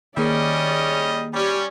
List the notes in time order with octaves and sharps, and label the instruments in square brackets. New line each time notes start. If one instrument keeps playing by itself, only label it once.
[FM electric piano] D#3 A#3 G#4 [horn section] G3 C#4 D#5 [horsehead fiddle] D5
[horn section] G3 C#4 [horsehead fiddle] G4 D5